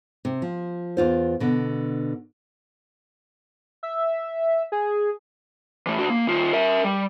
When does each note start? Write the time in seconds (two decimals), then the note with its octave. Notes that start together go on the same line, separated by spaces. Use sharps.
0.25 C3
0.42 F3
0.97 E2 F4 C5
1.40 B2 D3
3.83 E5
4.72 G#4
5.87 E3 A3
5.99 D3 F#4
6.10 A#3
6.27 D#3 F4
6.53 A#4 E5
6.84 G3